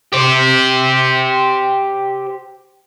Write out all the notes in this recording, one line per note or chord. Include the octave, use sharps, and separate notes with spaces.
G4 C5